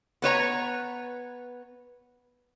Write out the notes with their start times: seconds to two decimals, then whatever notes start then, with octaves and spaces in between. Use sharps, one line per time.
0.22 B3 B4 C#5 A#5